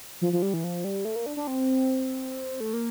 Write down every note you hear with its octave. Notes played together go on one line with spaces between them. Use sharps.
F3
F3
G3
E3
F3
G3
A3
A#3
D4
D4
C4
A3
A#3